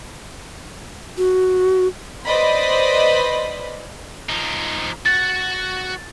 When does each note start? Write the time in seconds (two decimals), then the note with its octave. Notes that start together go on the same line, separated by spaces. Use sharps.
1.18 F#4
2.25 B4 C5 D5 D#5 B5 C6
4.29 F3 D#4
5.06 F#4 F#5 A6